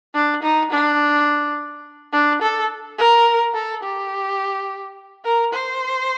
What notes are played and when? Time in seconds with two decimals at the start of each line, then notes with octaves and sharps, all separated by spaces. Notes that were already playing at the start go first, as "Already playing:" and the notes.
0.14 D4
0.43 D#4
0.70 D4
2.12 D4
2.41 A4
2.98 A#4
3.54 A4
3.83 G4
5.24 A#4
5.53 C5